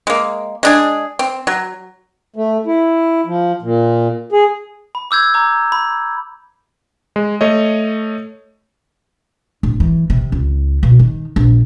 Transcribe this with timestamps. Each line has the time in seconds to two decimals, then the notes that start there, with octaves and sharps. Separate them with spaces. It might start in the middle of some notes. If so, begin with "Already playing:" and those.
0.07 G#3 A#3
0.63 G#3 D4 G#4
1.19 C4
1.47 F#3
2.36 A3
2.67 E4
3.26 F3
3.62 A#2
4.32 G#4
4.95 B5
5.11 D6 E6 G6 G#6
5.34 A#5 D6
5.72 B5
7.16 G#3
7.41 A3 C#5 D#5
9.63 D1
9.80 E3
10.10 C3
10.32 C#2
10.83 B2
10.99 D#3
11.36 A#1